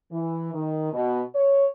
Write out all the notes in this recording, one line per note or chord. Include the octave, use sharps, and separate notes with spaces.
E3
D#3
B2
C#5